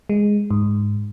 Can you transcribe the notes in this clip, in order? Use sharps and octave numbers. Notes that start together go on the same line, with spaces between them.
G#3
G#2